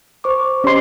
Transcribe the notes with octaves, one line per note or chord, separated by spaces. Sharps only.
C5 C#6 D6
C#4 G4 D#5 C6